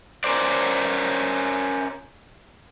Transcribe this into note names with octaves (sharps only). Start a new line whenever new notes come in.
C#4 A#4 C5 D5